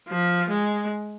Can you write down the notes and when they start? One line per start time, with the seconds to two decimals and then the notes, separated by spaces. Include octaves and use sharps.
0.08 F3
0.50 G#3